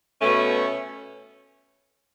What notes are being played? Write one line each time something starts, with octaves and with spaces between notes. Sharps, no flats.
B2 A3 C#4